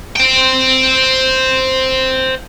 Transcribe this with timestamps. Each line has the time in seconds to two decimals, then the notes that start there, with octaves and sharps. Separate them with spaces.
0.16 C5 G5